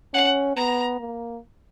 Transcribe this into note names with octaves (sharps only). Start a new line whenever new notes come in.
C#4 F#5
B3 A#5
A#3